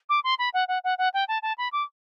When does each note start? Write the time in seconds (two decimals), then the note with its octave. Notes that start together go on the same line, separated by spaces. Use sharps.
0.09 D6
0.24 C6
0.39 B5
0.54 F#5
0.68 F#5
0.84 F#5
0.98 F#5
1.14 G5
1.28 A5
1.43 A5
1.58 B5
1.72 D6